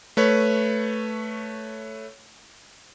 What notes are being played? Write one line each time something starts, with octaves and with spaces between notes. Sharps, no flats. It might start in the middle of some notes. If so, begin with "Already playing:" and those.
A3 B4 C#5